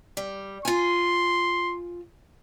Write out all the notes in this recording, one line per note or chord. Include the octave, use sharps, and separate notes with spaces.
G3
F4 G#5 C6